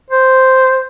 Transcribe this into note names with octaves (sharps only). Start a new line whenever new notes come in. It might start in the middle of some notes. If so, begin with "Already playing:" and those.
C5